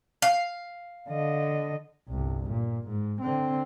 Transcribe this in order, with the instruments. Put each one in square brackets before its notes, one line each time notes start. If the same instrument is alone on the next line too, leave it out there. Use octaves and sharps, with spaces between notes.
[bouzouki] F5
[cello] D3 D#5
[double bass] G1 C2
A#2
G#2
D3 C4